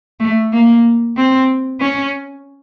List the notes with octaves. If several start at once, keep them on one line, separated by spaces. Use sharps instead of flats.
A3
A#3
C4
C#4